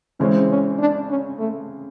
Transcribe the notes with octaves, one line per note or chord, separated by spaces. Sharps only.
C#3 E3 G#3 C4 C#4
C#4
D4
C#4
A3